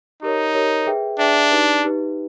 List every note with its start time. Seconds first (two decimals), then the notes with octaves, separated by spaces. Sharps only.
0.23 D#4 G4 A#4 C#5
0.54 G4 A#4 C#5
0.86 G#4 B4 E5 G5
1.19 D4 G#4 B4 E5 G5
1.51 D#4 G4 B4
1.83 D#4 G4 B4